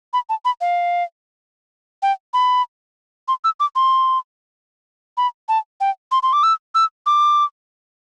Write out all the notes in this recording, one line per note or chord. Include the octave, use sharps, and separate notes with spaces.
B5
A5
B5
F5
G5
B5
C6
E6
D6
C6
B5
A5
G5
C6
C6
D6
E6
E6
D6